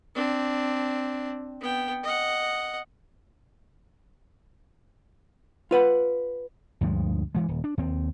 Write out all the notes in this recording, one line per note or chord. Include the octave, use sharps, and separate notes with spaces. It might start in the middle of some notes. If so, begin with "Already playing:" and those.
C4 D4
B3 G5
D#5 F#5
F4 B4 F#5
D2 G2 F3 G#3
G2 E3 G#3
D#1
D4
D#2 C4